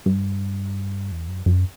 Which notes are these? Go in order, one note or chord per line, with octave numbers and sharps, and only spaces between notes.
G2
E2
F#2
F#2